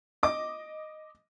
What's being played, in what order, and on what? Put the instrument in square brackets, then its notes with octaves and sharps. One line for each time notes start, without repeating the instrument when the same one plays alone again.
[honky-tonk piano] D#5 D6